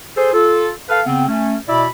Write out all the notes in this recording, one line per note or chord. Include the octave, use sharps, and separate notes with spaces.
G#4 A4 C5
F4 A4
A4 B4 F5
C#3 B3 C4
A3 C#4
B2 E4 D5 E5 B5